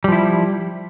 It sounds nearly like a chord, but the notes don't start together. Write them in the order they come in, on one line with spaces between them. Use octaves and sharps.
G3 F3 E4